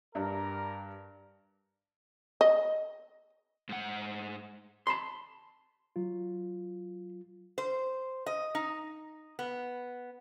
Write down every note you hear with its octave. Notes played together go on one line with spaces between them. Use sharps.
G2 G3 D4 A#4 A#5
D#5
G#2 F#5
A5 B5 C6
F#3 F4
C5
D#5
D#4
B3